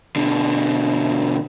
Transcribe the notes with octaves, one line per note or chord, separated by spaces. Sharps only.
B2 D3